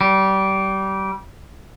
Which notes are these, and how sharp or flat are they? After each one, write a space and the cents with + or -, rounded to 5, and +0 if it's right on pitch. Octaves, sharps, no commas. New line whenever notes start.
G3 -25